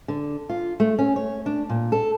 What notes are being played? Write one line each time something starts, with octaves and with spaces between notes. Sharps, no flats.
D3
F4
A3
C#4
C#5
D4
A#2
A4